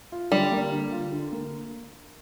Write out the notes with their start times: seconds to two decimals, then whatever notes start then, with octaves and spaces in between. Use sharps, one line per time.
0.12 F4
0.32 D3 G3
0.52 A#3
0.72 D3
0.92 F4
1.12 D3
1.32 A#3